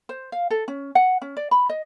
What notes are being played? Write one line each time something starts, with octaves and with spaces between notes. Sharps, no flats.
C5
F5
A4
C#4
F#5
C#4
D5
B5
D#5